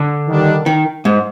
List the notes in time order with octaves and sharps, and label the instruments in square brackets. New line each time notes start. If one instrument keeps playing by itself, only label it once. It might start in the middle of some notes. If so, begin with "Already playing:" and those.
Already playing: [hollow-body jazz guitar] D3
[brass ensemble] D#3 G3 D4
[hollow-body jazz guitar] D#3
G#2